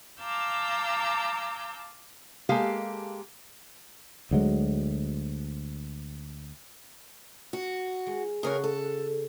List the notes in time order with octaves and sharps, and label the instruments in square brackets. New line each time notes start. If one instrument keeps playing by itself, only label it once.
[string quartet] F5 A5 A#5 D6 E6 G6
[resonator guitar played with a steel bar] G#3 A#3 G4 A4 F5
[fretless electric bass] D2 F#3 G#3
[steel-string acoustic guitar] F#4
[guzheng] G#3
[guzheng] C#3 A3 F#4 [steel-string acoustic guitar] G#4 A#4 C#5
[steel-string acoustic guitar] A4